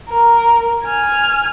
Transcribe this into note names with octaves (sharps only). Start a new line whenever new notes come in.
A#4
G#5 F6